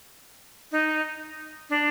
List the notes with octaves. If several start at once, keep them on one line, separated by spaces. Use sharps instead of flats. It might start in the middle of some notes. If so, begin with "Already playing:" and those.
D#4
D4